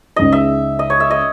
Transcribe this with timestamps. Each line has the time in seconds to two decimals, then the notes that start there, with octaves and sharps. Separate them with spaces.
0.16 C#2 C#3 G#3 D#4 D#5
0.32 E5
0.79 D#5
0.90 C#5
1.00 E5
1.11 D#5